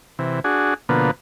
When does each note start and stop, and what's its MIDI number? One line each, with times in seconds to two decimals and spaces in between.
0.19 0.40 48
0.19 0.40 52
0.44 0.74 62
0.44 0.74 66
0.44 0.74 68
0.89 1.11 47
0.89 1.11 50
0.89 1.11 53
0.89 1.11 58
0.89 1.11 59